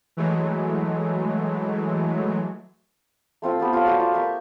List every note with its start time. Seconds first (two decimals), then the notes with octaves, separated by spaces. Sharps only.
0.17 E3 F#3 G#3 A3
3.42 A3 C4 F4 A4
3.60 B3 G4 A4
3.73 F4 G4 A4 C#5
3.86 F#4 G4 D5 F#5
4.00 F4
4.13 G4 A#4 E5 C#6